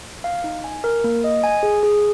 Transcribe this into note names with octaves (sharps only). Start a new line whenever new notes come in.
F5
D#4
G#5
A#4
A#3
D#5
G#5
G#4
G#4